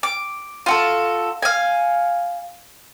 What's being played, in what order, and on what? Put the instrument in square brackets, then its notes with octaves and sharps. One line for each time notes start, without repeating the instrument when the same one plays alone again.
[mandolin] D6
F4 F#4 A4
F5 G#5